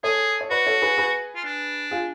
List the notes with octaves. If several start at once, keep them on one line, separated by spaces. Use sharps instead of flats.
G#4 A4 C#5
C#5
F#4 B4 D5
A4 C#5
G#4 B4
G#4 B4
F4
D4
F4 G#4